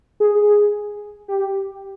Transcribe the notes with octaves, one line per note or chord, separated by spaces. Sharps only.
G#4
G4